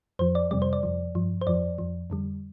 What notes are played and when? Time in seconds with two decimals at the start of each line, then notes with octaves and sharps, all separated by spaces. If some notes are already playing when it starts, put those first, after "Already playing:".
0.19 F2 F3 C5
0.35 D5
0.51 F2 C3 G3 D5
0.62 C5
0.73 D5
0.83 F2 F3
1.15 G2 F3
1.41 C5
1.47 F2 F3 D5
1.78 F2 F3
2.10 F2 D3 G3